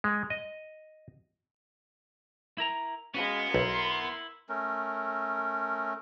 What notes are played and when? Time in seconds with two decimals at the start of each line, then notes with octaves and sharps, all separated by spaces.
0.04 G#3
0.30 D#5
2.58 E4 A#4 A#5
3.14 G#3 B3 C#4 F#4 B4 F5
3.54 B1 E4 A#4 C6
4.49 A3 C#4 A#4